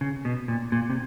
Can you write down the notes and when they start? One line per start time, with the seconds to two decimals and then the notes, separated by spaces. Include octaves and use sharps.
0.01 C#3
0.25 B2
0.48 A#2
0.72 A#2
0.90 C3